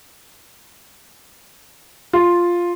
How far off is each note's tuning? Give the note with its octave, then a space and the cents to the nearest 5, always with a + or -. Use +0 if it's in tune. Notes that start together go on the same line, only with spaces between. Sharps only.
F4 +0